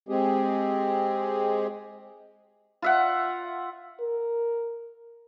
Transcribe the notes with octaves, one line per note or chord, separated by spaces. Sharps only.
G#3 C4 G4 G#4
F4 E5 F#5
A#4